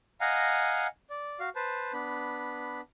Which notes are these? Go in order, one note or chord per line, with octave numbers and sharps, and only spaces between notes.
D#5 F5 F#5 G#5 A#5
D5
F#4 F5
B4 C5 A5
B3 D4 B5